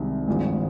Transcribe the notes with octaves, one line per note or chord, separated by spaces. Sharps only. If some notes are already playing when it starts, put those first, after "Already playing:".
Already playing: C2 C3 D#3 G#3
G#1 G2 F3 G#3